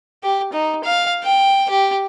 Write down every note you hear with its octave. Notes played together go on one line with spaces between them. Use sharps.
G4
D#4
F5
G5
G4